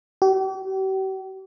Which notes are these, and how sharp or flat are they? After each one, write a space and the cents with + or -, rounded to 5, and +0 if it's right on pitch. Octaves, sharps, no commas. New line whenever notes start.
G4 -45